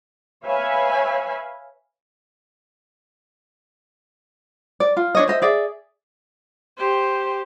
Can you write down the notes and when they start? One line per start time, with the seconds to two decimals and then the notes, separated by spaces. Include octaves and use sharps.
0.44 B4 C#5 E5 F5 G#5 B5
4.80 D5
4.97 F4
5.15 D4 C#5 D#5
5.28 C5 D#5 E5
5.42 G#4 D5 E5
6.78 G4 C5